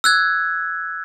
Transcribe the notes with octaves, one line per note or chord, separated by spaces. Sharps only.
E6 F#6 G#6